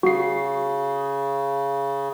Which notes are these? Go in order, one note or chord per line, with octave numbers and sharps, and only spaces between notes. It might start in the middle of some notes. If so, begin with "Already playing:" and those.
C#3 F#4 C7